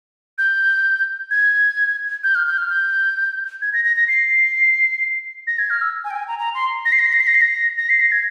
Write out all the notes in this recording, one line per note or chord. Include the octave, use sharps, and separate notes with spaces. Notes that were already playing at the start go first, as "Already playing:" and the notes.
G6
G#6
G6
F6
G6
F6
G6
G#6
A#6
A#6
A#6
C7
A#6
G#6
F6
E6
G#5
G5
G#5
A#5
A#5
C6
A#6
C7
A#6
C7
A#6
C7
A#6
C7
A#6
A#6
C7
A#6
G#6